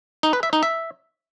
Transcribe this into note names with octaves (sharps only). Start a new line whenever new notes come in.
D#4
B4
E5
D#4
E5